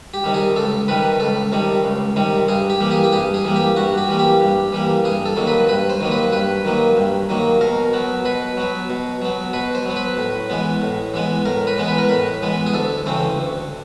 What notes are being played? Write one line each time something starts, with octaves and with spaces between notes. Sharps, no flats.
G4
C3 D#3 G3
G#4
C#2 A4
C3 D#3 G3 B4
C#2 A4
C3 D#3 G3
C#2
C3 D#3 G3
G2 G#4
G4
E3 G3 A#3
G#4
G4
G2 G#4
G#4
E3 G3 A#3
G4
G2 F#4
G4
E3 G3 A#3
G4
G2
E3 G3 A#3
G2 G#4
A4
D#3 F#3 A#3
B4
G2 B4
C5
D#3 F#3 A#3
B4
G2 B4
D#3 F#3 A#3
G2
D#3 F#3 A#3
B2 A#4
F#3 B3
B2 B4
F#3 B3
B2
F#3 B3
B2 B4
C5
F#3 B3
B4
A2
E3 G#3 B3
A2
E3 G#3 B3
A2 A#4
B4
E3 G#3 B3
B4
A#4
A2 B4
E3 G#3 B3
G#4
D2 A4
C#3 E3 A3 C4
D2